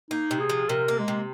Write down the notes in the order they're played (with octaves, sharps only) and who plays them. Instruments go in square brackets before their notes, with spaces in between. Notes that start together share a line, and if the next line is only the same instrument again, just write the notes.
[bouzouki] A#3 [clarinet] D#4
[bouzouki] C3
[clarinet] G#4
[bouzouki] F3
[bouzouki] C3 [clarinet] A#4
[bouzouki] A#3
[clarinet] G#3
[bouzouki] C3